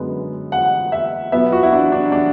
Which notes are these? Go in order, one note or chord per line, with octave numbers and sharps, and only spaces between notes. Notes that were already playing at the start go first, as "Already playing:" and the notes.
Already playing: F#2 D3 G#3 B3
F#5
E5
B2 F#3 B3 E5
F#4
E4
D4
D4
D4